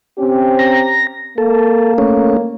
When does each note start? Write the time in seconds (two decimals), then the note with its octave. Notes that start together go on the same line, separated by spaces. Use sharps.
0.18 C4 C#4 G4
0.59 A#5
1.38 A#3 A4
1.98 A3 C#4